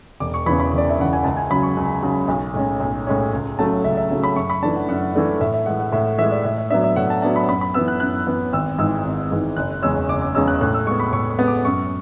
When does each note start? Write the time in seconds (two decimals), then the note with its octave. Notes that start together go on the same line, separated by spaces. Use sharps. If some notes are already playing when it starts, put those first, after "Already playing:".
0.20 E1 D6
0.34 C#6
0.46 E2 C#3 E3 B5
0.60 B5
0.73 E1 D5
0.89 E5
0.98 E2 C#3 E3 F#5
1.13 G#5
1.24 C#2 A5
1.37 G#5
1.50 C#3 F#3 B5
1.63 C#6
1.77 C#2
2.03 C#3 F#3
2.28 B1
2.54 A2 G#3 C#4
2.80 B1
3.07 A2 G#3 C#4
3.33 C#2
3.59 C#3 F#3 A3 A5
3.84 C#2 E5
3.97 E5
4.11 C#3 F#3 A3
4.24 B5
4.36 F#2 C#6
4.50 B5
4.62 E3 A3 D4 A5
4.76 F#5
4.88 F#2 F#5
5.15 E3 A3 D4
5.41 A2 E5
5.54 E5
5.66 E3 G#3 F#5
5.80 F#5
5.92 A2 E5
6.18 E3 G#3 E5
6.31 D5
6.44 A2 E5
6.58 E5
6.70 F#3 B3 D4 E5
6.84 E5
6.96 A2 F#5
7.10 A5
7.22 F#3 B3 D4 A5
7.36 B5
7.48 F#2 B5
7.61 B5
7.74 E3 B3 E6
7.88 F#6
8.00 F#2 F#6
8.27 E3 B3
8.53 G#1 E6
8.79 G#2 E3 G#3 E6
9.05 G#1
9.30 G#2 E3 G#3
9.57 F#1 F#6
9.82 E2 C#3 G#3 C#4 E6
10.09 F#1 D6
10.22 D6
10.35 E2 C#3 G#3 C#4 E6
10.48 F#6
10.61 A2 F#6
10.74 E6
10.86 G#3 B3 C#6
11.00 B5
11.13 A2 C#6
11.30 C#6
11.39 G#3 B3
11.48 D6
11.65 F#2 C#6